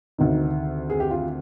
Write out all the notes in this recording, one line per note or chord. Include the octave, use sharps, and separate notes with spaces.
D2 C3 D#3 D#4
G#4
G4
F4